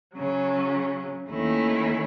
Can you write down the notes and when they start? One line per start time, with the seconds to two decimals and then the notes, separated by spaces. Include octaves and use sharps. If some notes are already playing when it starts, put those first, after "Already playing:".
0.15 C#3 F#3 C#4
1.29 D#2 D#3 A3 C#4 E4